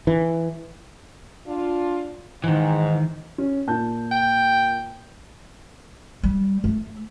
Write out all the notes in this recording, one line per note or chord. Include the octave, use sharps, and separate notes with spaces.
E3
D4 F4
G#2 D#3 E3
C#4
A#2 A5 G6
G5
G3
A3